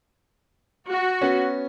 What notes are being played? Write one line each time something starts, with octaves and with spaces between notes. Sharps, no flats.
F#4
B3 C#4